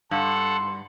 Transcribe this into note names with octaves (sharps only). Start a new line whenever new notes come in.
G2 A4 F#5 C6